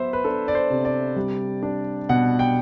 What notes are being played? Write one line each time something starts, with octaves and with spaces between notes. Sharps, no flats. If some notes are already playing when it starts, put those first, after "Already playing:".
Already playing: F#3 B3 C5 E5
B4
D4 A4
D5
C5
C3
D5
G3
D4
B2 F#5
G5